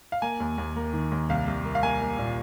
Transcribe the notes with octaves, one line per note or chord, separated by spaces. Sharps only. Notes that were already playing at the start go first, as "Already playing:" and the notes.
F5
A#3 G#5
D#2
D#2
A#3
D#3
D#2
C2 F5
C2
A#3
F5
A#3 G#5
A#3
A#2